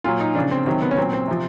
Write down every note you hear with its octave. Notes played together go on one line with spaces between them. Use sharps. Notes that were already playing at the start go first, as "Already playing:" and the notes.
A#2 F#3 F4
D#4
C#3 F3 D4
C4
C3 D#3 F#3 C4
B3
C#4
A#2 F#3 C4
C4
C3 F3